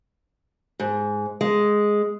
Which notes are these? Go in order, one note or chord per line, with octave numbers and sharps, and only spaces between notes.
G#2
G#3